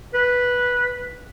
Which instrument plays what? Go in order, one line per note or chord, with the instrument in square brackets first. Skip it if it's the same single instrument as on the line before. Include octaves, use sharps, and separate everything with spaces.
[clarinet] B4